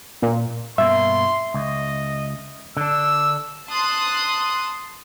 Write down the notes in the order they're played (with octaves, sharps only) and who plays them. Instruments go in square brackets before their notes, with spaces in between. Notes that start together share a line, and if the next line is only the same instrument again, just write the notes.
[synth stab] A#2
[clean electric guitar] G2 B2 A#3 [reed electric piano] E5 [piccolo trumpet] C6
[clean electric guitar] C#2 [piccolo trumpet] D#5
[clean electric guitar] D3 D4 [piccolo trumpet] E6
[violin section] A5 C6 D#6 F#6